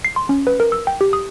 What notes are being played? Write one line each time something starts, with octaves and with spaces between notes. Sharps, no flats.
C7
C6
C#4
B4
A#4
E6
G5
G4
D#6